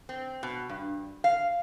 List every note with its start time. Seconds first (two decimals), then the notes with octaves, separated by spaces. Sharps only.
0.09 C4
0.43 B2
0.69 G2
1.24 F5